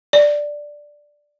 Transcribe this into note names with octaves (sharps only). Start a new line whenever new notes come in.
D5